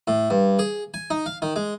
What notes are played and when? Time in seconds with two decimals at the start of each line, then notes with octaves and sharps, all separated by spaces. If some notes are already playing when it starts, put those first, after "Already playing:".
0.07 A2
0.30 G2
0.59 G#4
0.94 G#5
1.10 D#4
1.26 F5
1.42 D#3
1.56 G#3